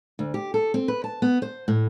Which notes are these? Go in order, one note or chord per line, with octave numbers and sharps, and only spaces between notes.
D2
G4
A4
C4
B4
A5
B3
C5
A2